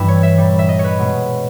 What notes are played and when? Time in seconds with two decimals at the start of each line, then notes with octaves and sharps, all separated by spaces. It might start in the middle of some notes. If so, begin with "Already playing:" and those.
Already playing: G2 E3 G3 E4 B4
0.08 C#5
0.23 E5
0.38 A#2 G3
0.59 E5
0.69 D#5
0.79 C#5
0.84 B4
0.99 B2 G#3